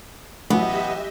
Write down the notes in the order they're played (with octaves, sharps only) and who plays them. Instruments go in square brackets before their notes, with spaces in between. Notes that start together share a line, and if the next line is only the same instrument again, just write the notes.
[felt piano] A1 E3 F#3 [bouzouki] B3 [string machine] G4 D#5 E5